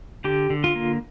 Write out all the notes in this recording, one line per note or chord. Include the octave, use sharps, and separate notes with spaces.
D3 G4
D3
F4
A#3